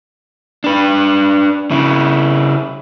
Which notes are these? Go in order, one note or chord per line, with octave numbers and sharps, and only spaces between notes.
D4 B4
C#3 E4